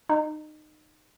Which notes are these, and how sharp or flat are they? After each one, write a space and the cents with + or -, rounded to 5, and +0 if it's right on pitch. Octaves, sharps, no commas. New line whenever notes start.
D#4 -25